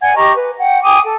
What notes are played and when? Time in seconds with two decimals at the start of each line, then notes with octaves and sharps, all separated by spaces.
0.01 D5 F#5 G#5 G#6
0.15 G4 D#5 A#5 C#6
0.35 B4
0.58 F#5 G5
0.82 G5 G#5 D6 D#6
1.03 A4